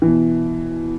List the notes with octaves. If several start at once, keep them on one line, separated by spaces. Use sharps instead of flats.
B2 E3